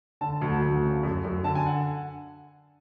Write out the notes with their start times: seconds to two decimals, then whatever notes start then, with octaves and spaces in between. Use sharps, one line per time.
0.21 D3 A5
0.41 D2
0.62 D2
0.83 C#3
1.03 F#2
1.25 F#2
1.44 D3 A5
1.55 G#5
1.66 F#5